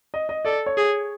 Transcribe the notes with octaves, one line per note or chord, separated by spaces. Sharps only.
D#5
D#5
A4 D5
C#5
G#4